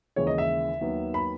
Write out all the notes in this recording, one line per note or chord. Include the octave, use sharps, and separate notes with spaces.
D#2 C#3 E3 G#3 C#5
D#5
E5
D#2 D#3 F#3 B3
B5